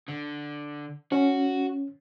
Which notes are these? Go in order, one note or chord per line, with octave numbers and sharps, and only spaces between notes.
D3
C#4 F#4